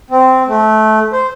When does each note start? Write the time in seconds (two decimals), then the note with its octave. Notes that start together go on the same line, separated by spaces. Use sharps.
0.11 C4
0.48 A3
1.12 C5